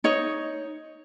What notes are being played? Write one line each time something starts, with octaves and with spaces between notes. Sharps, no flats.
D#4 C#5 D#5